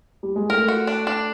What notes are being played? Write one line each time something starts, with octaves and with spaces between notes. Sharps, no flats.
G3
G#3
A3 A#4
F#4
D4
D4